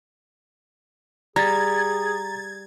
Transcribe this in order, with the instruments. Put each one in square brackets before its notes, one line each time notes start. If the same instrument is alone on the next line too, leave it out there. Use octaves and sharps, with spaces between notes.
[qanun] G3 [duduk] G#4 [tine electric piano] A#5 [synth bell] G#6 A6